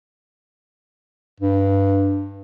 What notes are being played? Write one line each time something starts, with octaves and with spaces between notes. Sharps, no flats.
G2